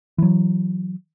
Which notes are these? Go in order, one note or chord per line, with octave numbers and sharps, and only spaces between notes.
E3 F#3